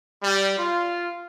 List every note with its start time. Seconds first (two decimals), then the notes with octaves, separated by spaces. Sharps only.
0.23 G3
0.58 F4